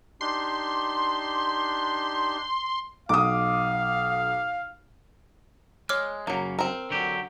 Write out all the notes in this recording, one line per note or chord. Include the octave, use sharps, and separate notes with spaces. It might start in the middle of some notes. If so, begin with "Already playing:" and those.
D4 D#4 G4 C6
B1 F5 D6 D#6
G#3 C#5 D6 F6
F#2 C#3 F#3 A#3
C4 A#4
D3 F#3 G4